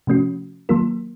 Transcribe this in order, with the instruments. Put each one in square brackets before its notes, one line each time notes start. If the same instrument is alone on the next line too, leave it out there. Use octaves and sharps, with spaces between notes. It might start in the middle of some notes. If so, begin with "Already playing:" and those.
[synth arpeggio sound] C3 F3 A3 C#4 F#4
D#3 F#3 A#3 F4 A#4